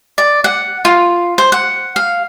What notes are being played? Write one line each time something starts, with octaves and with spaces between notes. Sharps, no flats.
D5
F#5
F4
C5
F#5
F5